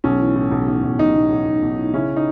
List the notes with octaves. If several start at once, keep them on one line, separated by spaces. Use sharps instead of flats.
B1 C#4
E3
A2
B1
B1
B1
B1 D#4
B1
B1
B1
B1
A2
C#3 C#4 E4
D#4